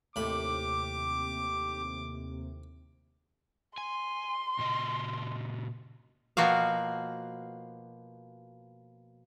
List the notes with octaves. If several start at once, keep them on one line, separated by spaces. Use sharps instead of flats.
D#2 A2 C3 G4 B5 D6
G#5 C6
A#2 C#3 D#5
B2 F3 A#3 F#4 F5